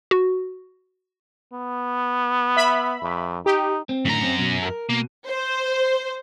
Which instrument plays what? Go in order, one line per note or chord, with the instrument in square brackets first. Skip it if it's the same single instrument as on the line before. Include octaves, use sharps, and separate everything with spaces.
[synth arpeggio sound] F#4
[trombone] B3
[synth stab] E5 B5
[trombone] F2
[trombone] D#4 [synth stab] G4
[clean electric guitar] C4
[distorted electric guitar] F#2 A#5 [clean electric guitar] A2 D3 D#3
[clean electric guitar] C4
B2
A4 A#4
[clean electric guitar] B2 [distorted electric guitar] A#3
[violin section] C5